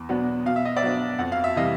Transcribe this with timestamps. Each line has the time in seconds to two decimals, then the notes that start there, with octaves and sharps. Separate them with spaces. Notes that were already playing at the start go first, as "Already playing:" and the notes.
Already playing: E2
0.09 B2 F#3 B3 D4
0.46 B2 F5
0.56 E5
0.65 D#5
0.77 D5 E5
0.83 F#3 B3 D4
1.19 F2 F#5
1.32 F5
1.44 E5
1.55 C3 E3 G3 D#5 F5